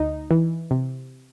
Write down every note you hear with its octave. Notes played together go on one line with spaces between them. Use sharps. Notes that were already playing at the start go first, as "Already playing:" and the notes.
Already playing: D2 D#4
E3
C3